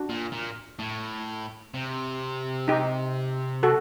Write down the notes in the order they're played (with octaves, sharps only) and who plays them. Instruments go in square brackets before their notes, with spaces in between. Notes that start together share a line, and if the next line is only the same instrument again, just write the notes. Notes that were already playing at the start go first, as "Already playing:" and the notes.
Already playing: [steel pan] D4 F#4
[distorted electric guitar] A#2
A#2
A2
C3
[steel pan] D#4 G4
F#4 A4